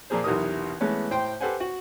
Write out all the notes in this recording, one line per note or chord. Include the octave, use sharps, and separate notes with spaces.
A#2 F3 A#3 G#4 C5
B1 E2 C3 A#4 D#6
E3 G#3 A3 B3 C#4
A2 C5 G5 C6
G4 A4 B4 C5 F#5 G#5
F#4